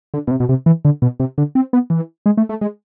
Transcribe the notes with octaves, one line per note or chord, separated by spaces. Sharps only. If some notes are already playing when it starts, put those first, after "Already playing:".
D3
B2
C3
B2
C3
E3
D3
B2
C3
D3
C4
B3
E3
G#3
A3
A3
G#3